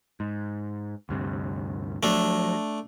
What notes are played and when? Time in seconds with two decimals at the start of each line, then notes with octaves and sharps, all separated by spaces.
0.20 G#2
1.09 D2 G2 C3
2.03 F3 F#3 A3 D4